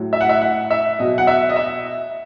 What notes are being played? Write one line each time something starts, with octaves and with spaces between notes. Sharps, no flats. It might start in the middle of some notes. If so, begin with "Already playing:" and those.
Already playing: A2 F#3
E5
F#5
E5
F#5
E5
B2 F#3 D#5
F#5
E5
D#5
E5